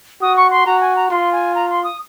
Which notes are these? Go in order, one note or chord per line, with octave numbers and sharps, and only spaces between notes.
F#4 D#6
C#6
C6
F#4 A#5
G#5
A#5
F4 C6
G#5
A#5
C6
D#6